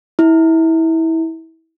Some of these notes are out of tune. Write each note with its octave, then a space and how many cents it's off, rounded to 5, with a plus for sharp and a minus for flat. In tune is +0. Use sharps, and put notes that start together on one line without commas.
E4 -25